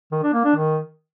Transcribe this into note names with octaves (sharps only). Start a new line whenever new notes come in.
D#3
D4
A#3
D4
D#3